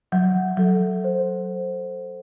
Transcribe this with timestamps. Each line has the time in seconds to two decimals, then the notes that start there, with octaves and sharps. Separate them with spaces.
0.12 F#3 F#5
0.57 F#3 A4
1.04 C5